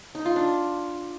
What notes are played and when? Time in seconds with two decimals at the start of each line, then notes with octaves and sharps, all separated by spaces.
0.15 D#4
0.25 F4
0.36 D4